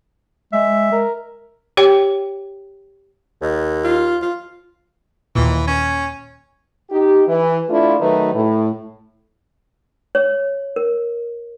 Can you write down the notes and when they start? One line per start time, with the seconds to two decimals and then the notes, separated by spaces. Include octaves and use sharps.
0.53 G#3 E5
0.92 A#4
1.77 G4 C#5 G5
3.42 D#2
3.84 F4
4.22 F4
5.35 D#2 A#2 E3
5.67 C#4
6.90 D#4 G4
7.27 E3
7.69 A3 D4 E4 F4
8.00 D#3 F#3 A3 D#4 B4
8.34 A2
10.15 C#5
10.76 A#4